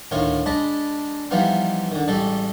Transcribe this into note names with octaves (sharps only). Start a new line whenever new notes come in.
D2 A2 D#3 F4 C#5
G#3 D4 D#5 A5 B5
E3 F3 G3 B3 D#4 F4
D3 D#3
A1 G3 G#3 A4